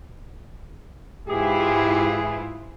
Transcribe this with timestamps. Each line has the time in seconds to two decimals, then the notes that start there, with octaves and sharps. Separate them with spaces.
1.28 G#2 E3 E4 F4 G4 G#4